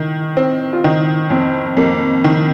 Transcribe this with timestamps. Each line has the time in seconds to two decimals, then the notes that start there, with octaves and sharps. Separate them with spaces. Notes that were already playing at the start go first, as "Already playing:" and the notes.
Already playing: D#3
0.37 C4
0.73 F4
0.84 D#3 D#4
1.30 F2 C4
1.77 F2 A#3
2.24 D#3